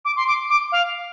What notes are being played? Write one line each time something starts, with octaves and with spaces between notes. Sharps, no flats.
D6
C6
D6
D6
F5